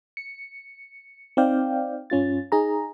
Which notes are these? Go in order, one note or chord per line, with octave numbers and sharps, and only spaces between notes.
C#7
C4 D#4 D5 F5 G5
G2 C#4 F4 A6
D#4 G#4 A#5